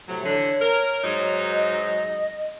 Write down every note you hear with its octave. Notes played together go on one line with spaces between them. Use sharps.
A2 C3 F#3
D3 E3 C#5
A#4
G#2 F#3 D#4
D#5